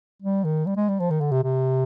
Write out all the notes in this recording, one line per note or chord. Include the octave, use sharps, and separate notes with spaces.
G3
D#3
G3
G#3
G3
F3
D#3
D3
C3
C3